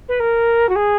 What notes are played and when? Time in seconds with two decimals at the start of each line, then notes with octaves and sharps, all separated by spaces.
0.08 B4
0.20 A#4
0.69 F#4
0.75 G#4